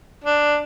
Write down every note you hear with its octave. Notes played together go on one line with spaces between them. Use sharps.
D4